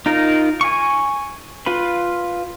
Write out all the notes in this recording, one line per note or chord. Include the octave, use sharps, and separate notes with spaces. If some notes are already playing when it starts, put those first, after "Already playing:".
D#4 F4 A#4
G#5 C#6
F4 B4 B5